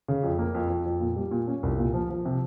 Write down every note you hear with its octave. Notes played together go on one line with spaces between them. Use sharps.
C#3
F2
A#3
F2
F2
F2
A#2
G3
A#2
C#4
C2
A#2
F3
F3
C3